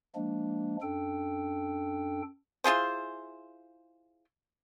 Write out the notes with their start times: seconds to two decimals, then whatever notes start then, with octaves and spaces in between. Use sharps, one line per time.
0.15 F3 G#3 A#3 D4
0.82 F#2 D4 A4 G5
2.64 E4 F4 G#4 C5